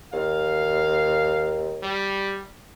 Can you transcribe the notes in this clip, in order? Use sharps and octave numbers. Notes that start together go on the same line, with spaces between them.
D#2 F5
G3